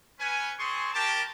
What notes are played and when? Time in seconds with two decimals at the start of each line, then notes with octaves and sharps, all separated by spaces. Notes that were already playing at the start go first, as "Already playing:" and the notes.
0.19 C#4 B4 G#5
0.59 G#3 C4 G#4 A5 C6 C#6
0.94 G4 A#4 A5